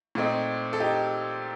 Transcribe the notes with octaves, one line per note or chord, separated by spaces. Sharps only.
A#2 A3 C4 D#4
A4
D#4 G4